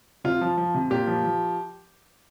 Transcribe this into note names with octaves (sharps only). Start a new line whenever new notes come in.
C3 F4
F3
F3
C3
A#2 G4
F3
F3